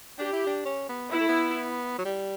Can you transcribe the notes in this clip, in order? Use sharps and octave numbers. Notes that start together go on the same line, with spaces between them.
D4 G4
E4
D4
C#4
B3
B3 E4
A3
B3
F#3
G3